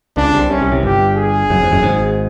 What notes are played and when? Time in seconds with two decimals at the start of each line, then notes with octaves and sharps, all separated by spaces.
0.17 C#2 C#3 D4
0.34 C2 C3
0.50 C2 C3 C#4
0.62 C2 C3
0.72 C2 C3
0.83 G1 G2 G4
1.16 G#4
1.50 F#1 F#2
1.61 F2
1.71 F#1 F#2
1.82 G#1 G#2